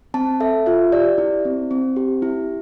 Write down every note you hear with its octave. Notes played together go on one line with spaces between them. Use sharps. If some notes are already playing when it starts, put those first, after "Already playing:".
C4 A5
A4 E5
F4 E5
G4 D5
E4
C4
C4
G4
E4